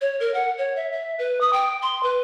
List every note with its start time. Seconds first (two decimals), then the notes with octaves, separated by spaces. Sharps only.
0.01 C#5
0.20 A#4
0.34 F#5
0.58 C#5
0.76 E5
0.92 E5
1.19 B4
1.41 D#6
1.53 G5
1.82 C6
2.03 B4